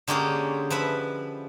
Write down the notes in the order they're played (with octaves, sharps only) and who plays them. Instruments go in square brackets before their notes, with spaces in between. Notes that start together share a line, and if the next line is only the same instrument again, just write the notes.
[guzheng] D3 G#3 A#3 C#4 G4 G#4
F3 B4 E5 B5